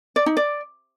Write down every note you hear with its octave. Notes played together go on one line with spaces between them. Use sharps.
D5
D#4
D5